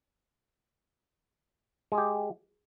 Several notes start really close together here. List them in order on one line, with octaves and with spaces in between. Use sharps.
G#3 G#4 G4